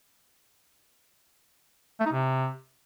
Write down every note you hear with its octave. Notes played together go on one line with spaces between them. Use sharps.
A3
D#4
C3